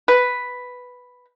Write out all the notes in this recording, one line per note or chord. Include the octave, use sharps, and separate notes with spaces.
B4